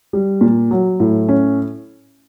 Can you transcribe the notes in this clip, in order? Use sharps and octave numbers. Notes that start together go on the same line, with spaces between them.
G3
A#2
F#3
A2
C#4